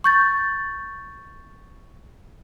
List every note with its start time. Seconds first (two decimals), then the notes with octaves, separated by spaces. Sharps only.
0.04 C#6 G6 A6